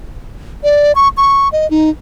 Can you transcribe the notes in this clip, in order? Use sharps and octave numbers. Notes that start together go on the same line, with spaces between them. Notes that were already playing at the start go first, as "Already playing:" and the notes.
D5
C#6
C#6
D#5
D#4